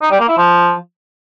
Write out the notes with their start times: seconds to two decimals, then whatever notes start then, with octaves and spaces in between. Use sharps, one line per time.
0.02 D#4
0.11 G3
0.20 A#3
0.29 E4
0.38 F3